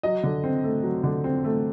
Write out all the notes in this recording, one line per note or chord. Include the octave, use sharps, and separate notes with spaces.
F#3 D#5
D3
C4
A3
F#3
D3
C4
A3